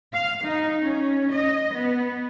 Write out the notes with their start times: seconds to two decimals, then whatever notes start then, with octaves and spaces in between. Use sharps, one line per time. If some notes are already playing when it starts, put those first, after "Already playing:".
0.13 F5
0.44 D#4
0.81 C#4
1.33 D#5
1.74 B3